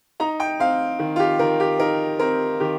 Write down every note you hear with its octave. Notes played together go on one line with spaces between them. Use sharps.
D#4 A#5
G5
C4 F5
D#3
F4
G4
D#3 A#4
G4
D#4 A#4
C4 A#4
D#3 G4